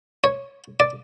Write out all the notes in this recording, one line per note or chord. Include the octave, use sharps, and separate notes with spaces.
C#5
D5